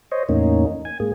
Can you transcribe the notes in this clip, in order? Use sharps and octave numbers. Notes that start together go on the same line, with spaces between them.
C5 C#5 D#5
E2 A2 A#3 C#4 D#4
G#5
G#2 A#3 G#4